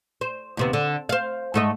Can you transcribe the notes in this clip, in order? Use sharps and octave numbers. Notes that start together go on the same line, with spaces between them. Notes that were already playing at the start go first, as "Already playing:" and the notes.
C5
D#2 C3 B3
D3
C5 F5
G#2 A3 D#5